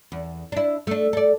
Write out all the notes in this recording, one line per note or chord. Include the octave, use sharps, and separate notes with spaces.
E2
D4 E4
A3 D4
A4 D5